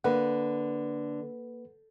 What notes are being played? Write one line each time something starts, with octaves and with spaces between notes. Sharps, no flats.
D3 A#3 B4 F#5